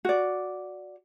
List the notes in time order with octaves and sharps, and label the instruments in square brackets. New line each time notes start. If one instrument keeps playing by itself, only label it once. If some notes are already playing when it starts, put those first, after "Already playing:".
[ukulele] F#4 D5